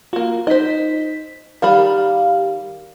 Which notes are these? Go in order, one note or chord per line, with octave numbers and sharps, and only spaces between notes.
A#3 F4 F#4
D#4 C5 D#5 B6
D#3 G3 G4 F5 B5